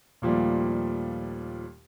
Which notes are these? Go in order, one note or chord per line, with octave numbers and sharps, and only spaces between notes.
D#2 A#2 F3 G3 A3